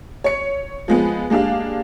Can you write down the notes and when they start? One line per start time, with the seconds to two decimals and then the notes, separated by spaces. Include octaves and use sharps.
0.24 C#5 C#7
0.88 F3 G#3 B3
1.30 G#3 A#3 D4 G4 F5